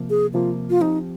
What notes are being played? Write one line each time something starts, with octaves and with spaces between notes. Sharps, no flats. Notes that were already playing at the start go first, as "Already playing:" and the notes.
Already playing: C3 F3 A#3
G#4
C3 F3 A#3 F4
F4
F3 C4 D#4 G4